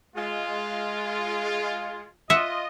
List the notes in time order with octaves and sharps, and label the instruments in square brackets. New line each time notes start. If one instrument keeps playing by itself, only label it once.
[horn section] G#3 F4
[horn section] F4 D#5 [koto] E5 F#5